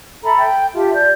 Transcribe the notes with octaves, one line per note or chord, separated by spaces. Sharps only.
A4 E5 A#5 B5
G5
F4 G4 E5 A5
D5 G6